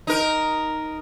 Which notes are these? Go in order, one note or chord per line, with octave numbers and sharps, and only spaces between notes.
D#4 A#4